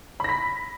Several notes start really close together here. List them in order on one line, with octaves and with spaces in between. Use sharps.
B5 A#6 B6